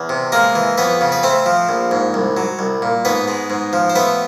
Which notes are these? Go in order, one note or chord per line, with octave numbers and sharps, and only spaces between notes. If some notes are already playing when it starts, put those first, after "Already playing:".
Already playing: E2
C3
G#3 A#3 A#4
E3
F2 B3 B4
C#3
B4
A3 C4 C5
F3
A#1
G#2
C2
F#3
C2
A#2
G#2 B3 B4
G#3
G#2
F3
C5
A3 B3 B4